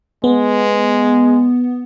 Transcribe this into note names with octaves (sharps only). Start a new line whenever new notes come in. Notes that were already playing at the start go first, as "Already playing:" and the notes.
G#3 B3